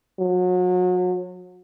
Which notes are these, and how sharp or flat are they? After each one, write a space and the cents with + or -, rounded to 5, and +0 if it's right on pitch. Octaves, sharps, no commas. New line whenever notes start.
F#3 -35